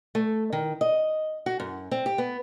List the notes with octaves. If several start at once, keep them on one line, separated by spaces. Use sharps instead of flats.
A3
D#3
D#5
F#4
F#2
C4
G4
B3